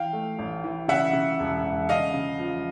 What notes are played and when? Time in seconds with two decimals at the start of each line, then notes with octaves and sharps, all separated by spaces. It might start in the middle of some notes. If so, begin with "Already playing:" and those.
Already playing: E3 F5 G5
0.13 A3
0.39 A1
0.64 E3
0.88 C#3 E5 F#5
1.13 C#3
1.39 E1
1.63 E1
1.89 C#3 D#5 F5
2.14 C#3
2.39 F3